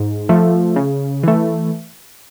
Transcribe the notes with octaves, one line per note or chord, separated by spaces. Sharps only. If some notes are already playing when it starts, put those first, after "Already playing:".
Already playing: G#2
F3 A3
C#3
E3 A3